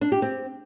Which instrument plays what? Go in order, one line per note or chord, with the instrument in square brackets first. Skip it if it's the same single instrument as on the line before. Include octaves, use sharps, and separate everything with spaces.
[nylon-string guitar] D4
G4
C4